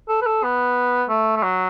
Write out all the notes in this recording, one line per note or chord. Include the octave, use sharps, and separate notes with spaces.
A4
B4
A4
B3
A3
A3
F#3